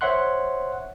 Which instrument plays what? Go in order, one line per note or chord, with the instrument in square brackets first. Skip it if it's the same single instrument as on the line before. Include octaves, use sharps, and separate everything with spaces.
[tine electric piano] C5 C#5 E5 F#5 C6 F#6